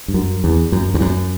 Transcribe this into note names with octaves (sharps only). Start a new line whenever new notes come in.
G2
F#2
E2
F#2
E2
F#2